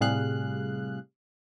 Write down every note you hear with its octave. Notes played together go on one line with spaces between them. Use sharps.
A2 C3 G3 G#4 F5 F#6